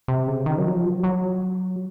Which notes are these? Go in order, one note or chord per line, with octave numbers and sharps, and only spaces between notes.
C3
C#3
D#3
F#3
F3
F#3
F#3